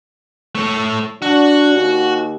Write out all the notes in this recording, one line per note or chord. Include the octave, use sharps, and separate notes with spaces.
A3 C#5
D4 F#4
D#2